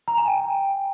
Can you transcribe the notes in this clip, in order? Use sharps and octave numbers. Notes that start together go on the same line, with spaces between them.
A#5
G#5
G5